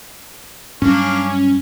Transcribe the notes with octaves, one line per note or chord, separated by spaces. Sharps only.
G2 F#3 A#3 C#4 D4 C#6